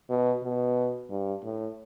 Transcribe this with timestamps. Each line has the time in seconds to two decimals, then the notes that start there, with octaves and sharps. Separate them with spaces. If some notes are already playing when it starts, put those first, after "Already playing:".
0.10 B2
0.43 B2
1.10 G2
1.44 A2